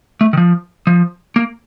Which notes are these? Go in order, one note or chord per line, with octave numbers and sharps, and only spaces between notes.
A3
D#3
F3
F3
A#3